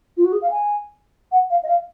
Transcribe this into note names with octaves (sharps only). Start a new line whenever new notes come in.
F4
F#4
G#4
F5
G#5
F#5
F5
D#5
F5